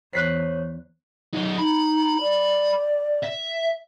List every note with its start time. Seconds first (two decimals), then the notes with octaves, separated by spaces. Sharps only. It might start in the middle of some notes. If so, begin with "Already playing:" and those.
0.13 E2 C5 C#5 F#6 B6 C7
1.33 F#2 D#4
1.58 D#4 B5
2.20 D5
3.23 E5